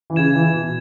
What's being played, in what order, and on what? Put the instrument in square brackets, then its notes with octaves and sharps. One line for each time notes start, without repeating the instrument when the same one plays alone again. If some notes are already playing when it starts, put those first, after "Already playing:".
[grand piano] E3
[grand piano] C#3 [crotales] G#6 E7
[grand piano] E3
B2